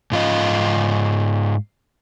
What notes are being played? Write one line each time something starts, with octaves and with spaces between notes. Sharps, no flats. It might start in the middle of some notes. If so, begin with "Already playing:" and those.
G#2 F4 D#5